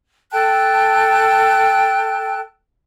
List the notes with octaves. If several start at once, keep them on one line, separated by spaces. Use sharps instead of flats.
A4 G5 A5 F#6